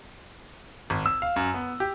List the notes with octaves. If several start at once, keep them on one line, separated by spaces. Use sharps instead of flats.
G#1
E6
F5
F#2
B3
G4